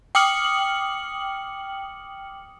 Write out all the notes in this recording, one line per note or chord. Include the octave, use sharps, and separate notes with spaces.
G5 D6 D#6 F6 C#7 F#7